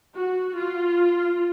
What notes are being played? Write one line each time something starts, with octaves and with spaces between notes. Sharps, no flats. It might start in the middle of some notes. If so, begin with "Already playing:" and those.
F#4
F4